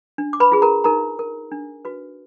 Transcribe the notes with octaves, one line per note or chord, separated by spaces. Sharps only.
D4
D6
B4 B5
F4 G#4 B4
A#4 A#5
D#4 A#4 A#5
A#4
D4
F#4 B4